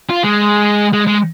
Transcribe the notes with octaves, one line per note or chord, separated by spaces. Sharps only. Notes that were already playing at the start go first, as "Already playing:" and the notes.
F4
G#3
G#3
G#3